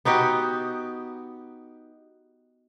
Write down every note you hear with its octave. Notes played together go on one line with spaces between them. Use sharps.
B3 D#4 F#4 G4